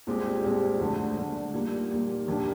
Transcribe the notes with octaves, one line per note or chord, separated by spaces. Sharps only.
C2 A#2 G#3 C4 G4
C2 A#2 G#3 C4 G4
D2 D3 G#3
D2 D3 G#3
A#1 A#2 G3 A#3 D#4
A#1 A#2 G3 A#3 D#4
D#2 D#3 A#3 D4 G4